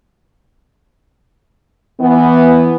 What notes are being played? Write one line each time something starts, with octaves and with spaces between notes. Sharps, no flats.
E3 B3